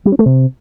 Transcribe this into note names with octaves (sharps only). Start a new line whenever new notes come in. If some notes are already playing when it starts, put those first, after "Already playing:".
G3
C#4
A3
C3